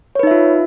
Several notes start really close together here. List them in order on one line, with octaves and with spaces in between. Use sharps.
C#5 B4 D#4 E5 F4